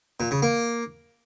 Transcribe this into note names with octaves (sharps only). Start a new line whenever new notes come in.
A#2
C#3
A#3